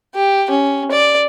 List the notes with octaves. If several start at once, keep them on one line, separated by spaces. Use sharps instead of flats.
G4
C#4
D5